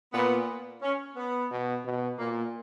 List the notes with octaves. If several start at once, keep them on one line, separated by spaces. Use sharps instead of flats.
A#2 B3
C#4
B3
B2
B2
A#2 A#3